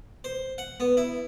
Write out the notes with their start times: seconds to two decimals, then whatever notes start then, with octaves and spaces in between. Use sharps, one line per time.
0.24 C5
0.58 F#5
0.80 B3
0.97 E4